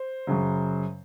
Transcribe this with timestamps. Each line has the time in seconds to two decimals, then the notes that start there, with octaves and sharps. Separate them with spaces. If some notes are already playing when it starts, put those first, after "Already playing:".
Already playing: C5
0.27 F#2 C#3 F#3